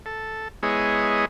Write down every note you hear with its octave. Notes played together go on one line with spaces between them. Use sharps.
A4
G#3 B3 E4 G#4 C#5 D#5